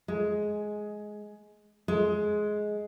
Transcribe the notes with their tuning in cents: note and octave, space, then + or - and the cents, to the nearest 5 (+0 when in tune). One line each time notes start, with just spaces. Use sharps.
G#3 +10
G#3 +15